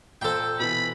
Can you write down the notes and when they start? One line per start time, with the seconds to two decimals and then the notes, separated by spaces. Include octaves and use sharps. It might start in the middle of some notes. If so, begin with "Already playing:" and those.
0.21 A#2 A4 C5 G5
0.59 B2 E3 B5